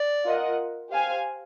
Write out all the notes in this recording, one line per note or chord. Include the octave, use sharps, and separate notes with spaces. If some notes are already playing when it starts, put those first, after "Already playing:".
Already playing: D5
F4 A#4 D#5 F#5
G4 C5 F5 G#5